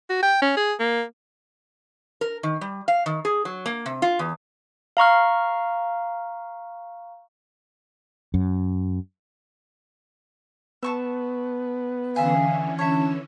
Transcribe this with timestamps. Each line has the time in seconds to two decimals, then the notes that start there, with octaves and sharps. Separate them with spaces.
0.10 F#4
0.23 G5
0.42 C#4
0.57 G#4
0.80 A#3
2.21 A#4
2.43 D#3
2.61 G3
2.88 F5
3.06 D#3
3.25 G#4
3.45 F#3
3.66 A#3
3.86 C3
4.02 F4
4.19 E2
4.97 F5 A#5 C#6 F6
8.34 F#2
10.83 B3 A5 C#6 E6
12.16 D3 E3 C#4 G#4 E5 F5
12.79 C#5 E5 A5